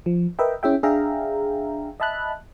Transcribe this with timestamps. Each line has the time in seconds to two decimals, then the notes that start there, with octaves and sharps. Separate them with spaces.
0.06 F3
0.39 A#4 B4 D#5 E5 G5
0.63 C#4 E4 G#4 E5 G5
0.83 D4 G#4 E5 F5 G5 A#5
2.00 D#5 E5 A5 B5 F#6